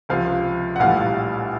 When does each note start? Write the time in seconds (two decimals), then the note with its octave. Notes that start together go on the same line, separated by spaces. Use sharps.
0.09 C#2 C3 F3 F5
0.76 F#5
0.80 A#1 A2 E3 G3 F5